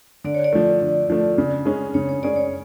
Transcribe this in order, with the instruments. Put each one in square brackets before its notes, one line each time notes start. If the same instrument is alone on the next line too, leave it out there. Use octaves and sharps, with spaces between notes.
[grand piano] D3 [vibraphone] D5
[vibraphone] C#5
D5
[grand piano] F3 A3
D3
F3 A3
C#3
G#3 C#4 G#4
[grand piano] C#3 [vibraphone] C#5
[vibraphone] C#5
[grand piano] G#3 C#4 G#4 [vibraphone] D5
[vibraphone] C#5